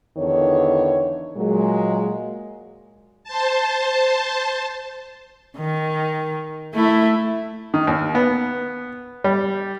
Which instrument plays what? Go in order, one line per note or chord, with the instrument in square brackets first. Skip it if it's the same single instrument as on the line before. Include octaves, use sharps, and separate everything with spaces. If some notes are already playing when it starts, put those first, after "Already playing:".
[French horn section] E2 D3 D#3 C#5
A#2 F#3 G#3
[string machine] C5 A5
[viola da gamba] D#3
A3 E4
[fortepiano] D#3
D#2
B3
G3